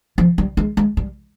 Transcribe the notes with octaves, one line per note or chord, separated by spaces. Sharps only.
F3
G3
G#3
G#3
G3